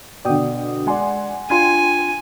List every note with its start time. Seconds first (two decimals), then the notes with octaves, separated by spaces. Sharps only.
0.25 B2 D3 D5 G5 D#6
0.87 G#3 D5 F#5 G#5 C6
1.50 D4 F4 G5 G#5 C6 G#6